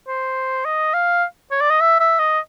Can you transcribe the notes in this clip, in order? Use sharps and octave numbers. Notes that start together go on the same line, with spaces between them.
C5
D#5
F5
C#5
D5
D#5
E5
E5
D#5